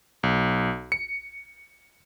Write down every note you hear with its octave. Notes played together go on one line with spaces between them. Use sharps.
B1
C#7